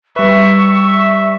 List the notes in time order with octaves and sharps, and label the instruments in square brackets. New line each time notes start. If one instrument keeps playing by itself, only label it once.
[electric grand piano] G3 B4 [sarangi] E5 [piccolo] C#6